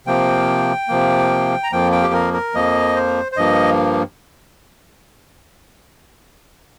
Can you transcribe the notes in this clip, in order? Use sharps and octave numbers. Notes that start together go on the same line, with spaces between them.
C3 F3 A#3 G5
C3 F3 A#3
A#5
F2 F3 A#3 G5
G5
G4
A#4
A#4
F2 F3 A#3 D#5
C5
C5
G2 F3 A#3 D#5